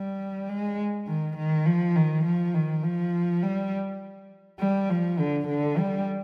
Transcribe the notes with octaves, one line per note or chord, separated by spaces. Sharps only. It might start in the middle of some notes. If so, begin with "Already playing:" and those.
Already playing: G3
G#3
D#3
D#3
F3
D#3
F3
D#3
F3
G3
G3
F3
D3
D3
G3